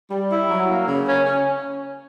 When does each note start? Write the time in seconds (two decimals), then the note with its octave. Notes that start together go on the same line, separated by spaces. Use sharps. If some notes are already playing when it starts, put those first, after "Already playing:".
0.11 G3
0.30 E4
0.50 F#3
0.68 A#3
0.87 C#3
1.05 C#4
1.24 C#4